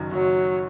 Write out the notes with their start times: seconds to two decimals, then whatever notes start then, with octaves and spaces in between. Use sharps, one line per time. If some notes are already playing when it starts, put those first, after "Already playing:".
Already playing: F#1 F#2 D#3
0.12 F#1 F#3